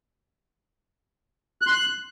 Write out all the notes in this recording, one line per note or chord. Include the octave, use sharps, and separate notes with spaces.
F#6
C6
F#6